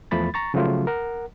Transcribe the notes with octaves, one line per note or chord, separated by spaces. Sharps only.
E2 F3 A3 B5 A6
A#5 C#6 A6
C#3 F3 F#3 A3 F4
A#4 F#5